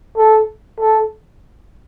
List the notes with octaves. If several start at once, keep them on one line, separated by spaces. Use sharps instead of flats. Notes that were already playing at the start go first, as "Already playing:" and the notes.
A4
A4